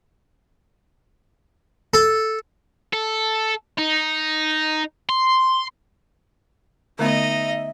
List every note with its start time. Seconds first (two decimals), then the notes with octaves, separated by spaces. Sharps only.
1.94 A4
2.93 A4
3.78 D#4
5.09 C6
6.99 D3 A3 B3 D#4 D#5 E5